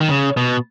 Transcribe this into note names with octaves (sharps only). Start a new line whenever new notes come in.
D#3
C#3
B2